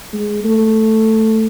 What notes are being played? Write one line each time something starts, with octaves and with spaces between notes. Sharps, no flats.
G#3
A3